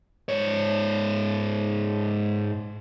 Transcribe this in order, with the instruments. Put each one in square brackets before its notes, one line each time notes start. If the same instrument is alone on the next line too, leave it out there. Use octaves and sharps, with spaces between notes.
[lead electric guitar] G#2 C#5